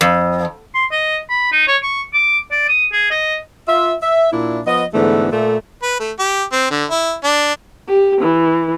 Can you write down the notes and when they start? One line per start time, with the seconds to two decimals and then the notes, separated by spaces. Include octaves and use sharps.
0.01 F2
0.74 C6
0.92 D#5
1.29 B5
1.52 D#4
1.67 C#5
1.82 C#6
2.14 D6
2.51 D5
2.68 D#6
2.93 G#4
3.11 D#5
3.68 F4 E5
4.03 E5
4.32 A#2 D4 E4
4.67 F3 B3 D#5
4.94 G#2 D3 E3 A3 B3
5.32 A#2 A3
5.82 B4
6.00 A3
6.19 G4
6.52 C4
6.70 D3
6.90 E4
7.24 D4
7.87 G4
8.21 E3